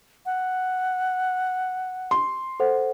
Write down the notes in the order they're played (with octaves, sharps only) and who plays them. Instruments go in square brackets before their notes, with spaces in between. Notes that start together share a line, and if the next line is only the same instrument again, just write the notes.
[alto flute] F#5
[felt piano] C6
[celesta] A4 C5 F#5